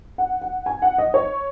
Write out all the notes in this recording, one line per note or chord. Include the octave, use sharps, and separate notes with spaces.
F#5
F#5
G#5
F#5
D#5
C#5